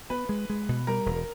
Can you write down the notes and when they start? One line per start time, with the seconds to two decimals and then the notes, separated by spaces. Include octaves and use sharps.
0.10 B3 B4
0.29 G#3
0.50 G#3
0.69 B2
0.87 G3 A#4
1.06 E1